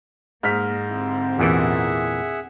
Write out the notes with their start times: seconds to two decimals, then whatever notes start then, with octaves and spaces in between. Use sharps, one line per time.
0.43 G#2 A#3 D#5 F6 B6
0.89 D3 C4 E4 G4
1.38 E2 A#2 E3 G#4 E5 F#5